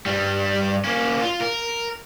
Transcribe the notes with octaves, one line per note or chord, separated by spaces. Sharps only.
G2 G3
A#3 C#4
F4
A#4